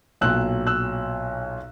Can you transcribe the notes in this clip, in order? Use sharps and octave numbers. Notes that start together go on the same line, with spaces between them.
B1 A#2 F#3 E6 F#6
E6 F#6